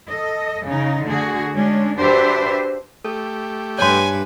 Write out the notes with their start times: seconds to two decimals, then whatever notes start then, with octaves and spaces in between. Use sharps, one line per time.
0.11 A4 D#5
0.67 C#3 D#4
1.06 D3 A3 F#4 G#4
1.56 G#3 C#4 D4
2.00 D4 F#4 G4 B4 C5 E5
3.04 A3 G4 A4
3.78 G2 B4 C#5 G#5 C6